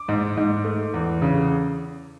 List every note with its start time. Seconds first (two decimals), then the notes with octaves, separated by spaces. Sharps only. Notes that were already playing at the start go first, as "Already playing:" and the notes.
Already playing: D6
0.08 G#2
0.37 G#2
0.64 A3
0.94 E2
1.22 C#3